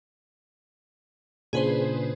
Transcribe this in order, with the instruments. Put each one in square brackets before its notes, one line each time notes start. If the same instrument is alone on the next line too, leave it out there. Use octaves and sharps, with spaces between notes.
[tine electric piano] A#2 C#3 D4 [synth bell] G#4 B4 C5